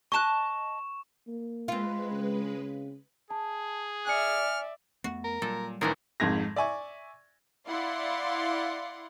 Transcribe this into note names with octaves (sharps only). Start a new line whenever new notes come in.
D#5 A5 C#6 F#6 E7
A#3
G#3 C4 F4 B4
C#3
G#4 A5
D5 E5 G#5 F6 C#7
F2 A3 B3 F#4
A#4
A#2 F#3 G3 A4
A1 D#3 E3 D4 F4 G#4 A#4
G#1 F2 G#2 G#6 A#6
D5 E5 G#5 C#6
E4 D5 F5 F#5 C6